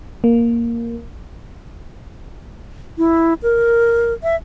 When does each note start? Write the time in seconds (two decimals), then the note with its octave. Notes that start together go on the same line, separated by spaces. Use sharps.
0.24 A#3
2.98 E4
3.43 A#4
4.23 E5